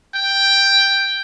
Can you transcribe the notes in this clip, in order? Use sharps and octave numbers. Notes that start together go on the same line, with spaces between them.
G5